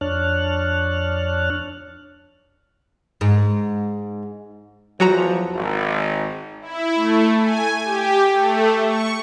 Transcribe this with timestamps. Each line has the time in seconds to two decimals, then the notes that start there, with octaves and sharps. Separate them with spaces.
0.01 F2 D4 C#5 A5 F6 F#6
3.21 G#2
5.00 E2 F3 F#3 F#4 A#5
5.54 G#1
6.61 E4
6.95 A3
7.42 G#5
7.84 G4
8.33 A3
8.86 C#6